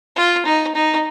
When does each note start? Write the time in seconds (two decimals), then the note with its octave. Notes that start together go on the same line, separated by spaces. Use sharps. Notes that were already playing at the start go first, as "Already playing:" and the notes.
0.16 F4
0.46 D#4
0.75 D#4